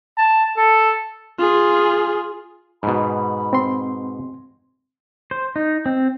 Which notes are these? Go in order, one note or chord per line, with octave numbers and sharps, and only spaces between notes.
A5
A4
F4 G#4
G#2 B2 B5
C4 C6
C5
D#4
C4